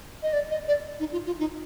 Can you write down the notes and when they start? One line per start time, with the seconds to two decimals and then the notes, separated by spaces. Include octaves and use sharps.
0.23 D#5
0.33 D5
0.51 D#5
0.68 D5
1.00 D#4
1.12 F4
1.26 F4
1.39 D#4